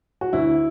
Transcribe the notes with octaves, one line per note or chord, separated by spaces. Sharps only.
F#4
D2 E4